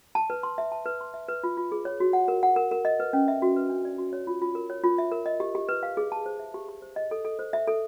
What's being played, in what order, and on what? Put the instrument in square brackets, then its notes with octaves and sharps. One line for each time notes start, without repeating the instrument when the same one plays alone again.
[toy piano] A5
B4
C6
E5
A5
B4
C6
E5
B4
F4
F4
G#4
C#5
F#4
F#5
A#4
F#5
A#4
A#4
D#5
B4
C#4
E5
F#4
B4
D4
D5
F#4
C#5
F4
F4
A#4
C#5
F4
E5
A#4
D#5
G4
G4
B4
F5
G#4
A5
C5
E5
G4
G4
C5
D#5
A4
A4
C5
E5
A4